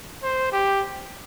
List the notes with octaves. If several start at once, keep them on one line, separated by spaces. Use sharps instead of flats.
C5
G4